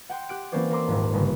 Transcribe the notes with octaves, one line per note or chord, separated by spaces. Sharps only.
F#5 G5 C6
G4 F#6 D7
E3 A#3 C4 C#4 C5 D5
A#4 A#5 C6 D6 E6
D#1 G#2 D4
G1 C#3 D#4